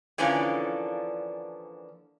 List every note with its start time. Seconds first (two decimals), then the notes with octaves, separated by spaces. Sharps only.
0.18 D3 E3 F3 A#3 C#4 D4